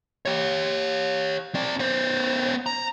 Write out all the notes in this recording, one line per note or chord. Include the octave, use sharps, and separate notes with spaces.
G4 C#5
C4 D5
B3 C5
A#5